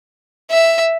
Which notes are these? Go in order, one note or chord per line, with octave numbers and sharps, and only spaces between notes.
E5